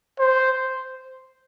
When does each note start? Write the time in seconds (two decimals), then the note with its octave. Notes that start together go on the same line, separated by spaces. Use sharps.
0.20 C5